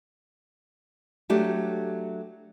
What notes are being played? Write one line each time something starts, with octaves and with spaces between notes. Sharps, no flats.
F#3 A3 D4 G4